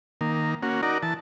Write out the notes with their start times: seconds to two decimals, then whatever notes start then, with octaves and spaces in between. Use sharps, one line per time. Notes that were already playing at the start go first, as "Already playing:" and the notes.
0.21 D#3 A#3
0.63 A#3 C#4 F#4
0.83 D#4 F#4 A#4 D5
1.03 E3 A5